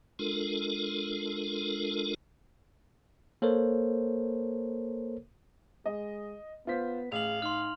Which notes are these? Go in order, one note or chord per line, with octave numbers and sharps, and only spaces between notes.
G#3 D4 F4 A4 A#4
A#3 A4 A#4 C5 C#5
G#3 D#5
B3 F4 C5 B6
A1 G#4 F5 F7 F#7
D#4 C6 F6